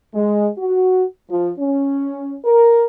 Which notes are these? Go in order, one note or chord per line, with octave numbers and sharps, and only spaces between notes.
G#3
F#4
F3
C#4
A#4